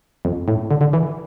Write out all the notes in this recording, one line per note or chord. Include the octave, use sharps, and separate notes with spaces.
F2
A2
D3
D3
E3